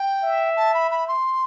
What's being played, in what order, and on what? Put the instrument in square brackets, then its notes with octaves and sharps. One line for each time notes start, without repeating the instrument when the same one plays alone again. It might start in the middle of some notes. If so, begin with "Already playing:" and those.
Already playing: [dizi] G5
[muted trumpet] E5
[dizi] A5
B5
B5
C6